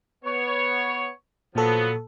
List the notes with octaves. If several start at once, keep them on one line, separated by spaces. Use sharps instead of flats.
B3 C#5
A#2 F3 F#3 B3 A4